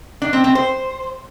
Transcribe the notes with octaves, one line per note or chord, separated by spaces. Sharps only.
D4
C4
C4
C5